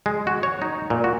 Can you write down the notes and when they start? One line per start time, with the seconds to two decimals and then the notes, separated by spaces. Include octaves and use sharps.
0.06 G#3
0.27 F#4
0.43 C#5
0.62 D#4
0.90 A#2
1.04 F#4